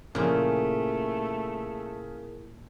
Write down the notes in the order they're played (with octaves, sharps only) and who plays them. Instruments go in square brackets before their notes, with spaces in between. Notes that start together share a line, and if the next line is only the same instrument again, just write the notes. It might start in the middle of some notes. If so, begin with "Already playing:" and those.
[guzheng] A#2 F3 [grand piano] C#3 [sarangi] A3 [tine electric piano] E4 G#4 A#4